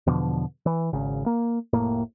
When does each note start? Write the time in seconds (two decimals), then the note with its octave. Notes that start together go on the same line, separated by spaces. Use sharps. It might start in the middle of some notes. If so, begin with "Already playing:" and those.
0.07 E2 B2 D3 F3
0.66 E3
0.93 G#1 C#3
1.26 A#3
1.73 F1 A2 A#3